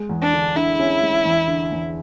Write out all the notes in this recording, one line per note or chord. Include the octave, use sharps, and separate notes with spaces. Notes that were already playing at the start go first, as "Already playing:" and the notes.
Already playing: G#3
E2
D4
D3
D3 E4
C#4
G#3
E2
D3
E2